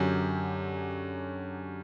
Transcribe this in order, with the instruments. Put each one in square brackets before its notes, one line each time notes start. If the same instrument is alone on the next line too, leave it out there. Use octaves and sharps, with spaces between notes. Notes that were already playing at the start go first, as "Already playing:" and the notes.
Already playing: [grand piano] F#2 [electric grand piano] D3 F#3 C#4 G4 C#5